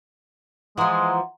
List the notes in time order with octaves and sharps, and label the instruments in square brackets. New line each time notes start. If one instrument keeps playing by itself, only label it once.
[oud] E3 F3 [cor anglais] G#3 [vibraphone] F#5 A#5 C6